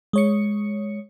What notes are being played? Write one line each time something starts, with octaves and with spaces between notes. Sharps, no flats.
G#3 C#5 C#7